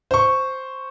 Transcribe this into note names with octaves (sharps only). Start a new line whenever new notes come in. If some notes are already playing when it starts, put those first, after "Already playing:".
C5 C#6